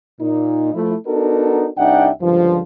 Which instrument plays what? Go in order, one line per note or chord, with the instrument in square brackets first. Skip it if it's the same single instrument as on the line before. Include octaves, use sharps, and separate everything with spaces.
[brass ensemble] A#2 D#4
F3 A3 E4
B3 D4 D#4 F#4 A4 A#4
C2 D4 D#4 E5 F#5 G5
C#2 G2 D3 F3